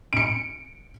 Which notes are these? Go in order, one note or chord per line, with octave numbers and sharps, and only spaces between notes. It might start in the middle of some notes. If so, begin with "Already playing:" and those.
C#7 D7